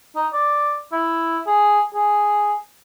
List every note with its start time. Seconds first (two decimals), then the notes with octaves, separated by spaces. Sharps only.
0.16 D#4
0.33 D5
0.92 E4
1.46 G#4
1.94 G#4